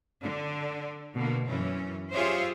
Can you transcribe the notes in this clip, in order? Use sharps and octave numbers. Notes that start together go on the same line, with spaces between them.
D3
B2 D3 A#3
F#2 E3 C#4
F4 G4 G#4 C5 C#5 E5